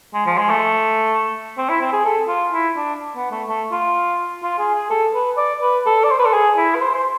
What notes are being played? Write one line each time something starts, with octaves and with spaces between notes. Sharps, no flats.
G#3
F3
G#3
A3
C4
E4
C4
G#4
A4
F4
E4
D4
B3
A3
A3
F4
F4
G#4
G#4
A4
B4
D5
B4
A4
D5
C5
B4
A4
G#4
E4
B4
C5
C5